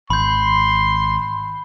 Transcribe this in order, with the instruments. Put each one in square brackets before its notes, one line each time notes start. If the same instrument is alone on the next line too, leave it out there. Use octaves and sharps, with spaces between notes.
[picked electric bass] G#1 [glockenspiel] B5 G6 [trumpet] C6